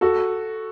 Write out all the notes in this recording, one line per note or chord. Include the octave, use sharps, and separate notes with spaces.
F#4 A4